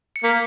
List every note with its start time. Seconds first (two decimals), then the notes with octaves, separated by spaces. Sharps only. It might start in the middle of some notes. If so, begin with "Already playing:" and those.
0.16 C#7
0.24 A#3 B6